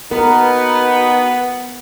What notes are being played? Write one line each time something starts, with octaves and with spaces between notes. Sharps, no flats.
B3 D#4 F#4 A#4 B4